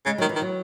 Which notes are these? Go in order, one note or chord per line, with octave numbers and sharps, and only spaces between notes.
C#3 G#3
D#3 F#3
E3
D#3
F#3